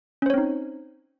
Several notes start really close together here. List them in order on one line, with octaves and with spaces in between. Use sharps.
C#4 C5 C#5 C4 D#4